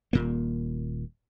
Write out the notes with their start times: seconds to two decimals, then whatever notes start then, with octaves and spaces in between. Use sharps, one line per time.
0.13 D#1 A#2 A#3